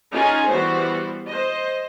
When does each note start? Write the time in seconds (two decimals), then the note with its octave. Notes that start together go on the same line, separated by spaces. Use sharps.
0.12 C#4 D#4 F4 G#4 G#5
0.49 E3 G3 B3 F#4 C5
1.27 C5 D#5